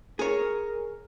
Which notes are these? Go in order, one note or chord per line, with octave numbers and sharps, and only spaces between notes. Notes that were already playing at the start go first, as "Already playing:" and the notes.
G#4 A#4 C#5